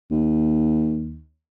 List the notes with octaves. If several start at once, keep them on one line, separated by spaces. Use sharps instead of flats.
D#2